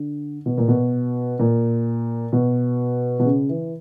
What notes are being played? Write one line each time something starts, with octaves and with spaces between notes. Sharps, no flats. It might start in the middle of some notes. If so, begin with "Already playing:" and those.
Already playing: D3
B2
A#2
B2
A#2
B2
B2
C#3
E3